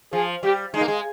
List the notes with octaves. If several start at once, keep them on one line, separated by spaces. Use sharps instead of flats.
F3 G#4
G3 G4
G#3 D#4
A#3
G#3